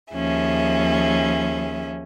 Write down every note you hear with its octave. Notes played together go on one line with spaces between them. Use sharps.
D#2 F3 C#4 G#4 E5